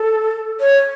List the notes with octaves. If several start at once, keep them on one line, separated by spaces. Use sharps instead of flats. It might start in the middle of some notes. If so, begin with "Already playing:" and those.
Already playing: A4
C#5